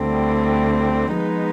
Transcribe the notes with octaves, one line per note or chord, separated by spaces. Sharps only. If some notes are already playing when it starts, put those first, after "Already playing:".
Already playing: D2 D3 G3 C4
F3 G#3 B3 D#4